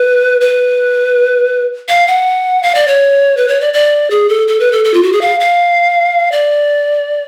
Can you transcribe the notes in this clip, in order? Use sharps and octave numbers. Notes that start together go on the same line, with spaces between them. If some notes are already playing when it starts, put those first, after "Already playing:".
Already playing: B4
B4
F5
F#5
F5
D5
C#5
B4
C#5
D5
D5
G#4
A4
A4
B4
A4
A4
F4
F#4
G#4
F5
F5
D5